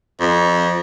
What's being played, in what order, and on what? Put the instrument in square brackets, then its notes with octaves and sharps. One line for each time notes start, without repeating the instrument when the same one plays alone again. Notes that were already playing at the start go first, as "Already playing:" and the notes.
[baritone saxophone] F2